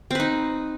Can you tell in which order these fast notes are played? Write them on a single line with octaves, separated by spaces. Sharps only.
C4 B4 D#4